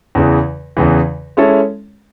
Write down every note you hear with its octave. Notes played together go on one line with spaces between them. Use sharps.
E2 C#3 E3
E2 C#3 E3
G#3 C#4 E4 A4 C#5